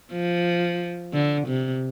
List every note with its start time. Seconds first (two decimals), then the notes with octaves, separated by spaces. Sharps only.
0.12 F3
1.13 D3
1.47 C3